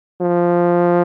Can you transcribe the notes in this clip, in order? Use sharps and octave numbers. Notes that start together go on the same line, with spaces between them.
F3